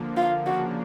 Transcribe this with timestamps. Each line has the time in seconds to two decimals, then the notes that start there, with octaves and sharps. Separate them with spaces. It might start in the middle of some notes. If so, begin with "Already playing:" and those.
Already playing: D3 F3 A#3
0.17 F4
0.46 C#3 F3 A#3 D4 F#4